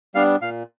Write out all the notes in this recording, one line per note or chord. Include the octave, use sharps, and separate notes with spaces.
G3 B3 D4 F5
A#2 F5